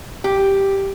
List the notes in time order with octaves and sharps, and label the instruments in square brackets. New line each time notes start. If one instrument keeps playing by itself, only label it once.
[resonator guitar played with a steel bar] G4